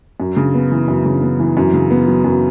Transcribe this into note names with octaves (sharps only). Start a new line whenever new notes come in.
F#2
C#3
B3
E3
F#2
C#3
B3
E3
F#2
C#3
B3
F#3
F#2